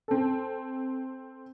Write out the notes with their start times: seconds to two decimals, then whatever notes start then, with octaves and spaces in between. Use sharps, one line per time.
0.08 C4 A4